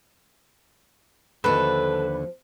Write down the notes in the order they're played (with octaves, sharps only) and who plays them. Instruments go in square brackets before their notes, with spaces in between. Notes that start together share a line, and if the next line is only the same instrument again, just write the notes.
[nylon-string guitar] D#2 D3 B3 [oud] F3 F#4 [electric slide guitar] A4 [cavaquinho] B4